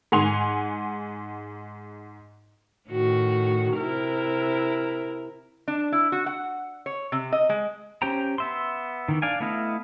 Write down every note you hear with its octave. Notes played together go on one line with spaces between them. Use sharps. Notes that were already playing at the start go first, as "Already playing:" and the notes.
G#2 F#5 G#5 C6 F7
A2 D#3 F#4
C3 E4 A#4
D4
E4
F#4
F#5
C#5
C3
D#5
G#3
C#4 G4 C5 G5 A#5
B3 E5 C6
D#3 E3
D4 D5 F5 G#5
A3 B3 E4 D#5 F5